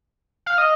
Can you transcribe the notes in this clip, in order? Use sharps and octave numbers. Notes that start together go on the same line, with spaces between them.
F5
D#5